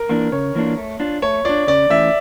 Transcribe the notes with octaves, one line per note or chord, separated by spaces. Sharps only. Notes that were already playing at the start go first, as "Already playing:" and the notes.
Already playing: A#4
E3 A#3 D4 F4
C#3 C#5
E3 A#3 D4 F4
A3
D4 F4
A3 C#5
D4 F4 D5
C#3 D5
E3 A3 C#4 E5